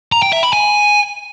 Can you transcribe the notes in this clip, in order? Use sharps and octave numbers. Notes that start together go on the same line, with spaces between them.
A#5
G5
E5
B5
G#5